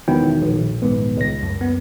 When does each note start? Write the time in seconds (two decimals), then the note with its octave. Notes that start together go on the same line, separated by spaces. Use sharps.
0.08 E1 D#3 F#3 B3 E4 G5
0.42 A#1
0.82 D#1 G#2 B3
1.17 C#2 A#6
1.43 F#2
1.61 B3